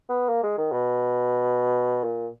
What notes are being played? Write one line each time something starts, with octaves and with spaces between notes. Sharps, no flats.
B3
A#3
G#3
D#3
B2
A#2